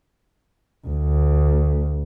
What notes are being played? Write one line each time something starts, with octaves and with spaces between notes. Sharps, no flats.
D2